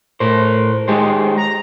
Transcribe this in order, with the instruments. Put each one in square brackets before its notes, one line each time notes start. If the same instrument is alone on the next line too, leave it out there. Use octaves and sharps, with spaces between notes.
[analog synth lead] A2 [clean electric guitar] A#4 C5
[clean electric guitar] D#3 G4 C5 [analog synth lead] G#3
[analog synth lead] A#5